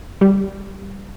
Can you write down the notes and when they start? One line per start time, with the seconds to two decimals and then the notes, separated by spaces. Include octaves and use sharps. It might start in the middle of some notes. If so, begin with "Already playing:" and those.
0.21 G3